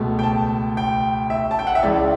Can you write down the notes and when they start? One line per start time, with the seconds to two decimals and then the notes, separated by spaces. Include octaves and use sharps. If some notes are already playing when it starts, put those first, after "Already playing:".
Already playing: C#2 B2 A3
0.19 G5
0.23 A5
0.77 G5
1.30 E5
1.51 A5
1.59 G5
1.67 F#5
1.75 E5
1.83 C#2 C#3 E3 D5